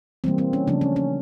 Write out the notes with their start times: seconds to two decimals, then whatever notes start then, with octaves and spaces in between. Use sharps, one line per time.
0.24 E3 G3 A#3 C4
0.38 C4
0.53 C#4
0.67 C#3 F3 A3 C4 D4
0.81 C#4
0.96 C#4